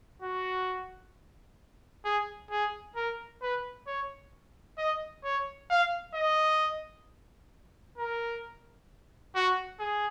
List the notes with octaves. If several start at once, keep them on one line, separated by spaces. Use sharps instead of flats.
F#4
G#4
G#4
A#4
B4
C#5
D#5
C#5
F5
D#5
A#4
F#4
G#4